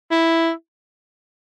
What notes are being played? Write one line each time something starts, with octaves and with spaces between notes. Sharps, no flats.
E4